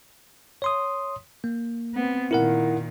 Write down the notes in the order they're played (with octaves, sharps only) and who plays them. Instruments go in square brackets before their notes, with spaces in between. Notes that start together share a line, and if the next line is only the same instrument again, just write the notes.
[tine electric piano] C#5 C6 D#6
A#3
[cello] B3 C4
[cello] A#2 D#3 [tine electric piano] E4 A#4 F#5